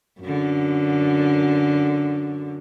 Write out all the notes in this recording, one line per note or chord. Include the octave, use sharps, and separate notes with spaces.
F#2 D3